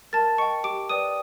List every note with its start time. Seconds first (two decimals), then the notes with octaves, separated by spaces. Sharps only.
0.13 A#4 A5 A6
0.38 D#5 G5 C#6 C#7
0.64 G4 D6 D7
0.89 B4 D5 G5 D#6 D#7